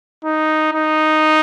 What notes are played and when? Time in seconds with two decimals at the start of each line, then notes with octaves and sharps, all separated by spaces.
0.25 D#4
0.73 D#4